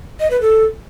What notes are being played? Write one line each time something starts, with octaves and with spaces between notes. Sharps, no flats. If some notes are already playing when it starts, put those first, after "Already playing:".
D#5
B4
A4